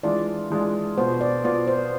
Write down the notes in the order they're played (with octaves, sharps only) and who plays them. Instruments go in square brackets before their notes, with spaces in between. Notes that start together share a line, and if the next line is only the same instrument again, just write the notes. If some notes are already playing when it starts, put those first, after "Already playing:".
[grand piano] E3 G#3 D4 F4 [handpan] D5
[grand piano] E3 G#3 D4 F4
[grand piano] B2 B3 F4 [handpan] C5
[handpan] D5
[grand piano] B2 B3 F4 [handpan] D5
[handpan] C5